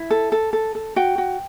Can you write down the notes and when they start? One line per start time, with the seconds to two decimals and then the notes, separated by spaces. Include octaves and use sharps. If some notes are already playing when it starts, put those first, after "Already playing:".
Already playing: E4
0.10 A4
0.32 A4
0.53 A4
0.75 A4
0.96 F#4 G5
1.18 F#4